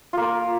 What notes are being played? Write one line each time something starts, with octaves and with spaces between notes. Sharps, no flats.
A#3 F4 A#4